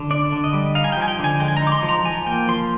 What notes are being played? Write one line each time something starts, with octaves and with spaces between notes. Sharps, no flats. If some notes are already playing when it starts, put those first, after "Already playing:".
Already playing: D3
D4 D5
D3
D#5
G3
D#4 F5
G#5
G5
F3
G#5
G5
D3 G#5
G#3 G5
G#5
A#5
D#4 D6
C6
F3
A#5
F3 G#5
A#3 G5
F3 C6